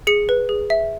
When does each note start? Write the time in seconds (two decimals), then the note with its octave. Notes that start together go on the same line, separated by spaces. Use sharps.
0.07 G#4 C#7
0.29 B4
0.49 G#4
0.70 E5